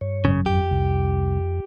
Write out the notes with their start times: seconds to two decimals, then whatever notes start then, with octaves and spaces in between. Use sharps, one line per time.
0.01 G2 C#5
0.25 G#1 F#2 C#3
0.46 F2 G4
0.71 C2